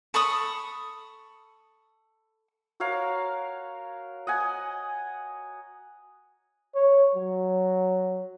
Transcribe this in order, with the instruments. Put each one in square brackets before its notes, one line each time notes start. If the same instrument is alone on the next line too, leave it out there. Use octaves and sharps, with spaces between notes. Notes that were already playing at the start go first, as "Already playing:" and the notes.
[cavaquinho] A4 B5 C#6 D#6
[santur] F#4 A#4 C#5 F5
D#5 F#5 G#5
[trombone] C#5
F#3